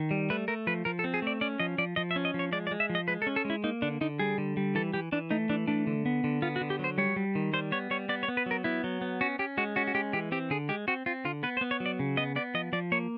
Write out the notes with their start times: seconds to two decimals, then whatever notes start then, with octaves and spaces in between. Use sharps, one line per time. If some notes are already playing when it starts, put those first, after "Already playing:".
Already playing: D#3
0.11 G3
0.30 A3 B4
0.48 A3 A#4
0.67 F3 B4
0.85 F3 A#4
0.99 A4
1.04 C4
1.14 G#4
1.22 A3 D5
1.41 C#4 D5
1.60 F3 D#5
1.78 F3 D5
1.96 F3 D#5
2.11 E5
2.16 C#4
2.25 D#5
2.34 F3
2.39 C#5
2.52 G#3 D5
2.67 D5
2.71 G#3
2.80 E5
2.90 F3
2.95 D#5
3.08 G#3 B4
3.22 A4
3.26 C#4
3.36 A4
3.45 G#3
3.50 E4
3.64 A#3 D#4
3.82 D3 D4
4.01 D3 D#4
4.19 G3 G#4
4.38 D3
4.57 G3
4.75 E3 A4
4.93 E3 G4
5.12 E3 D4
5.31 A3 D#4
5.49 E3 D4
5.67 A3 D4
5.87 D3
6.06 B3
6.24 D3
6.42 B3 F4
6.56 F#4
6.61 D3
6.70 G4
6.79 F#3 C5
6.98 G3 C#5
7.16 G3
7.35 D#3
7.53 G3 C5
7.72 B3 C#5
7.91 G3 C#5
8.09 B3 D5
8.23 C#5
8.28 B3
8.37 B4
8.46 F#3 A#4
8.64 B3 E4
8.84 F#3
9.01 B3
9.21 C#4 F#4
9.39 C#4 G4
9.57 G#3 F#4
9.76 C#4 F#4
9.87 F#4
9.95 G#3 G4
10.13 E3 G4
10.32 C4 G4
10.50 D3 G#4
10.69 G#3 G4
10.88 C4 F#4
11.06 C4 F4
11.25 D3 F4
11.43 B3 B4
11.57 C5
11.61 B3
11.71 C#5
11.80 F#3
11.86 D5
11.99 C#3
12.17 B3 D#5
12.36 B3 D5
12.54 F3 D#5
12.73 F3 D5
12.92 A#3 C#5